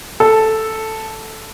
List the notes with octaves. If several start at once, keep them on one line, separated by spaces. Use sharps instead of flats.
A4